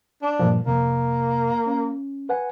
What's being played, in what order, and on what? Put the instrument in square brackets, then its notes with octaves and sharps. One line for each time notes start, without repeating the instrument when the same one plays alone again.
[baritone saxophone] D4
[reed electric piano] G2 A#2 F3
[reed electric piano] F2 C3 [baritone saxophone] A#3
[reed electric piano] C#4
B4 F#5 G#5